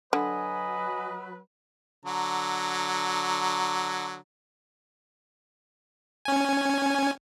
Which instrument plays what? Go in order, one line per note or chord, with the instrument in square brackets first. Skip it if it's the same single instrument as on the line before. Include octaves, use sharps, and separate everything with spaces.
[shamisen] D3 [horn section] F#3 B4 [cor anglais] D#5 [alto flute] G#5
[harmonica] D3 F#3 A#5
[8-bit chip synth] C#4 G#5